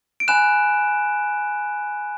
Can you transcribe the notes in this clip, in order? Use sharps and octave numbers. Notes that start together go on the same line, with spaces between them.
D7
G#5 B5 F#6 E7